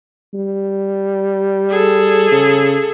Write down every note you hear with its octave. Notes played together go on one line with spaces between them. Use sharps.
G3
G#4 A4
C#3